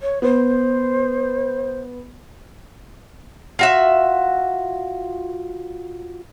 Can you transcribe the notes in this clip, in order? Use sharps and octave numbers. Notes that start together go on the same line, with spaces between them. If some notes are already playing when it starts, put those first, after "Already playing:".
C#5
B3 C5
F4 F#4 E5